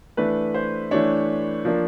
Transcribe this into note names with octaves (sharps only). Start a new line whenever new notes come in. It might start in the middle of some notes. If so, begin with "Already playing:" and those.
E3 A3 D4 B4
C5
E3 A3 D4 C#5
F3 A#3 D4